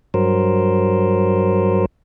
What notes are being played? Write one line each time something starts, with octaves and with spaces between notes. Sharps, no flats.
G2 F#3 A#4 C5